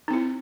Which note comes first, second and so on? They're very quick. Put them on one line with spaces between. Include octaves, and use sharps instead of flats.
D#4 C4 E4